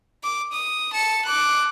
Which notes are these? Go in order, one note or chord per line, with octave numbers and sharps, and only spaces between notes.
D6
D#6
A5 C#7
D6 F#6